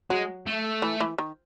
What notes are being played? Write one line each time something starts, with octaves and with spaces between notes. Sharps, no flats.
F#3 G#3
A3
E3
E3
D#3